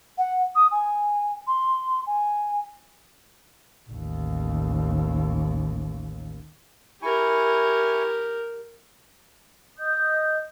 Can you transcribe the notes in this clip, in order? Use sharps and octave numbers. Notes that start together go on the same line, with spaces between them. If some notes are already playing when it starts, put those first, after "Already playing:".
F#5
D#6
G#5
C6
G#5
A1 D#2
E4 G4 A#4 G#5 C#6
D#5 D#6 G6